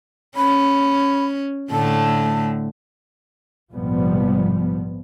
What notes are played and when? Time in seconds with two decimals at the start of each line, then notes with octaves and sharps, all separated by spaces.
0.37 C#4 B5
1.71 A2 D3 A3 A5
3.72 A#1 G#2 C3 F3 G3 B3